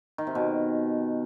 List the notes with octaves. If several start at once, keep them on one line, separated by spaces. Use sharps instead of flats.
D#3
C3
B2